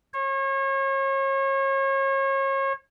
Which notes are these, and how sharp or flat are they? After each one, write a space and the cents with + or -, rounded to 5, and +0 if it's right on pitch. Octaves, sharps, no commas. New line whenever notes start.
C#5 -35